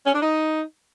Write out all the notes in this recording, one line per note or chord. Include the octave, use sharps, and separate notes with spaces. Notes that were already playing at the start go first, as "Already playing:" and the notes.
C#4
D4
D#4